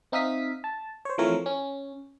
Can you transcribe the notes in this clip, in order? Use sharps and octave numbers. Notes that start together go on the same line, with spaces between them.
C4 D#4 E5 F5 D#6 B6
A5
C5 C#5
E3 F3 A3 C4 A#4 C#5
C#4